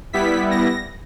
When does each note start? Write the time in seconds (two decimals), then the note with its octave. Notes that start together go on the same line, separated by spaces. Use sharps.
0.13 G3 B3 E4 B6
0.51 A#6